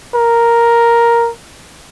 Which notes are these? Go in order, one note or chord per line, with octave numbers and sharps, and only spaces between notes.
A#4